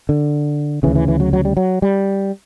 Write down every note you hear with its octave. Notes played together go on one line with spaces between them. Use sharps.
D3
D2 C#3 E3
E3
E3
F#3
F#3
G3
F#3
G3